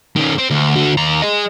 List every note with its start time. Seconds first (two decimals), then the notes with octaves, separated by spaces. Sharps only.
0.16 D#3 C#4
0.38 C4
0.50 D2
0.76 D3 F#4
0.97 D#2 A#5
1.22 G#4 D#5